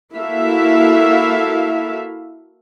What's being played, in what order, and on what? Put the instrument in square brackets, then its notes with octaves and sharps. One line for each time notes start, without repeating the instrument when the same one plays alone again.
[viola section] A#3 E4 F#4 A4 E5 F5